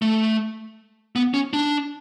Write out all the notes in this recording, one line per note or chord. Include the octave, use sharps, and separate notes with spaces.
A3
B3
C#4
D4